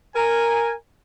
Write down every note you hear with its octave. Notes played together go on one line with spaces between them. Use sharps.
A#4 G#5